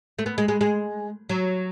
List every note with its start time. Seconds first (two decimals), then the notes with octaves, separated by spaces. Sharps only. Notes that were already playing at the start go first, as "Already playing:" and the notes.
0.19 A3
0.26 B3
0.38 G#3
0.48 G#3
0.61 G#3
1.29 F#3